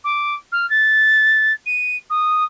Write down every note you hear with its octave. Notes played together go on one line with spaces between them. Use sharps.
D6
F6
A6
D#7
D#6